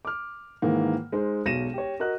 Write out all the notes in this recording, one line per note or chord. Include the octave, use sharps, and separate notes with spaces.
D6 F6
G#2 D#3 E3 A#3
G#3 D#4 C5
E1 B1 A#6 D#7 E7
G4 C#5
F#4 A#4 D#5 F#6